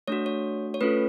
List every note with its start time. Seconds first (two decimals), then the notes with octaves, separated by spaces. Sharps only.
0.08 A3 D4 F#4 C#5
0.26 C#5
0.74 C#5
0.81 A3 C#4 F4 A4 B4